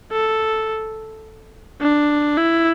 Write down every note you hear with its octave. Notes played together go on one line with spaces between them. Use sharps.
A4
D4
E4